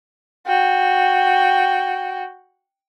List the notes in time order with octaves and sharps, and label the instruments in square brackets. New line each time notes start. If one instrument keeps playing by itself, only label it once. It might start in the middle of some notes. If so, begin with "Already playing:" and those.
[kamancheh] F#4 G5